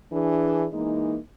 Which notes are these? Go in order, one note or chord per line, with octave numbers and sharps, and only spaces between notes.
E3 D4 G#4
E3 G#3 A#3 D#4